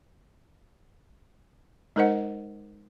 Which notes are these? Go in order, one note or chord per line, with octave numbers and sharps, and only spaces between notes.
G#3 D#4 A#4 C5 D#5 F#5